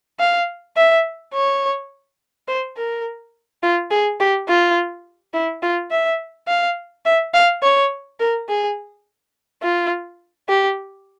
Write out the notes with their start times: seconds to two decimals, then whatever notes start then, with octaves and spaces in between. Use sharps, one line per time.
0.20 F5
0.77 E5
1.34 C#5
2.48 C5
2.77 A#4
3.63 F4
3.91 G#4
4.20 G4
4.48 F4
5.33 E4
5.63 F4
5.91 E5
6.48 F5
7.05 E5
7.34 F5
7.62 C#5
8.20 A#4
8.49 G#4
9.62 F4
10.49 G4